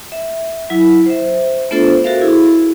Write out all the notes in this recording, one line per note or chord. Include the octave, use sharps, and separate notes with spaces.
E5
F#3 E4
C5 E5
A3 B3 D4 F4 A4 C5
F#4 A4 A#4 C5 E5 F5
E4 G#4